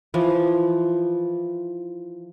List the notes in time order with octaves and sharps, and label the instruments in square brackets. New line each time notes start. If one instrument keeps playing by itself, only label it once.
[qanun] E3 F3